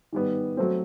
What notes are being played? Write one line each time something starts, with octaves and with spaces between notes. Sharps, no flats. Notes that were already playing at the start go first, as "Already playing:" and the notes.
D#3 G3 B3
F#3 A3 C4